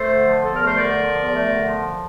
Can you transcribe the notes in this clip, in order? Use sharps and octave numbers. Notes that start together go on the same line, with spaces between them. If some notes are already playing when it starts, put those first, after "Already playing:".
Already playing: A3 A4 C5
D3
F3
E2 A4
A3 A#4
C5
D3 A#4 D5
F3
E2
A3
D3
F3